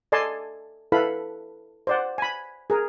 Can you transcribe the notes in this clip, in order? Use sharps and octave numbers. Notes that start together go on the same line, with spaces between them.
A4 D5 D#5 G#5 A5 C6
E4 A4 B4 F5 B5
C5 D5 F#5
G#5 B5
G#4 A#4